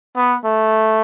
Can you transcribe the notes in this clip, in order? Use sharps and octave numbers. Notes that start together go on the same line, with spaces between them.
B3
A3